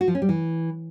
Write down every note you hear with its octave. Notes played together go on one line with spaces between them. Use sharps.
F#4
F3
C#4
G3
E3